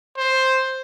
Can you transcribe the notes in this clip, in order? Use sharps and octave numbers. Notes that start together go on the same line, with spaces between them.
C5